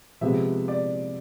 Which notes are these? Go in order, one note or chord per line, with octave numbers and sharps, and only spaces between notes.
C3 F3 G#3 B3 E5
D5